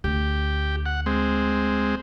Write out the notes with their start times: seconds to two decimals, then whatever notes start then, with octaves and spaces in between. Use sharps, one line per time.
0.04 D2 G4
0.86 F#5
1.06 G#3 C4